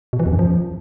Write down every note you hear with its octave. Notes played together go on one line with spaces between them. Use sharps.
B2
E3
E2
F#2
F3